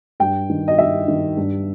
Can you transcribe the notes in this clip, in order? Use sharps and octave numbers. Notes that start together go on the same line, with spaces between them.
G2 G5
D#3
D#5
G2 E5
D#3
G2